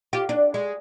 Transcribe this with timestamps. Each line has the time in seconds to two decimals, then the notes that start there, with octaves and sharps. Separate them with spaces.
0.13 F4 G4
0.29 D4
0.54 G#3